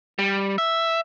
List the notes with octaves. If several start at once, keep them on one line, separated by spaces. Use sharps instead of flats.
G3
E5